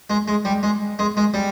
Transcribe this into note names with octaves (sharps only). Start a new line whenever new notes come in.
G#3
G#3
G3
G#3
G#3
G#3
G3